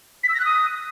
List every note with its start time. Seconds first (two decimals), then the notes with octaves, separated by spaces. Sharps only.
0.23 B6
0.29 E6
0.34 A#6
0.39 F#6
0.45 D#6